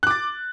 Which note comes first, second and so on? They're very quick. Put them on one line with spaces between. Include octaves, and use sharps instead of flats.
F#6 D6 A6